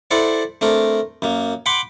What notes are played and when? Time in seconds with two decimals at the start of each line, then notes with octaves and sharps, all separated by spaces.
0.11 E4 A4 C5 D5 F#5
0.61 A3 C4 D4 A#4
1.22 F#2 A#3
1.66 F#5 G5 B5 C6 D6